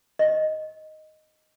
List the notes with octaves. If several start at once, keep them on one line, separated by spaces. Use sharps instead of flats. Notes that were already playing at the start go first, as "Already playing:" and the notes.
D#5